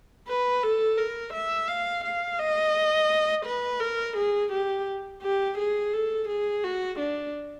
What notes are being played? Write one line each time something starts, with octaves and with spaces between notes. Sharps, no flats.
B4
A4
A#4
E5
F5
F5
D#5
B4
A#4
G#4
G4
G4
G#4
A4
G#4
F#4
D4